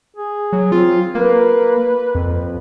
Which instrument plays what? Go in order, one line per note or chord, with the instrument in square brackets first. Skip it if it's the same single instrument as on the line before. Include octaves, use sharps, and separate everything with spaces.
[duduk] G#4
[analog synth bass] F#3
[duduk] C4 [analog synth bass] F4
[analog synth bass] A#3 [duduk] B4
[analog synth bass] F2